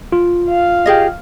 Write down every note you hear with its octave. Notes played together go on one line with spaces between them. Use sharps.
F4
F5
G4 G#4 D#5